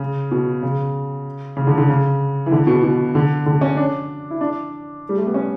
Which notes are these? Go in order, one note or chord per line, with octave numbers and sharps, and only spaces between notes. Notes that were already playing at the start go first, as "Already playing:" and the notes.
Already playing: C#3
B2
C#3
C#3
D3
D3
C#3
E3
D3
B2
B2
D3
D3
C#4
D4
E4
D4
G3
A3
B3
C#4